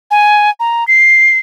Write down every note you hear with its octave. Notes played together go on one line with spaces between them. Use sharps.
G#5
A#5
C7